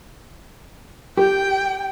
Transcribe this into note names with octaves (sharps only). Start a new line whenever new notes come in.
G4 G5